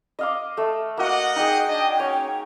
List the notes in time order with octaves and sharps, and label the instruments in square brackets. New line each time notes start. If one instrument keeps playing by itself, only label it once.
[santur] D#5 F5 D6
A3 A4
[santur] A#3 F#4 [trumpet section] D#5 F#5
[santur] D#4 G#4 [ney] G5
[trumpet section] D4 D#5
[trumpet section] C#4 [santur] C#5